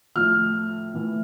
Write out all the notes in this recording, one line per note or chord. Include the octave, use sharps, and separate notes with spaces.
A2 F3 F6
A2 E3